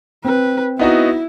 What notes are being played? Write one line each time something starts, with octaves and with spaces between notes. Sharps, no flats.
C4 B4
B3 D#4 E4 F#4